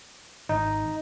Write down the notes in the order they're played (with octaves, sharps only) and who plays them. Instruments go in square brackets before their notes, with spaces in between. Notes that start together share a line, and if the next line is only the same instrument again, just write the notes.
[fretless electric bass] G#1 [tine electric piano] D#4